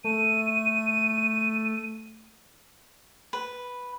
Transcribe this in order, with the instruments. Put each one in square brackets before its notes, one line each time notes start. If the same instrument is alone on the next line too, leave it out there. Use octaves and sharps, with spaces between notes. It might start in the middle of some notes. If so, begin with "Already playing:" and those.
[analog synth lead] A3 [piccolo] D#7
[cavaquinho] B4